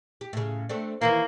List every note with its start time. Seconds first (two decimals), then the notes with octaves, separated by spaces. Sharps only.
0.21 G4
0.33 A2 C#3
0.69 A3 C4 D4
1.01 D#3 E3 A#3 E4